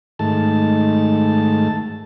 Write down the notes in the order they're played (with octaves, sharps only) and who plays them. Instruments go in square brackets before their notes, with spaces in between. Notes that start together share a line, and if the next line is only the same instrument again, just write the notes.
[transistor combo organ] G#2 D#3 A3 A5